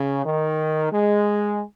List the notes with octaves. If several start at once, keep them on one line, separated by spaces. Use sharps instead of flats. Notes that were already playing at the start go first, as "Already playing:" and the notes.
Already playing: C#3
D#3
G#3